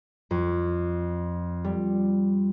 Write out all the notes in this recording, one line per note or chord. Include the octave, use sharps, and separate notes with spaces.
F2
G3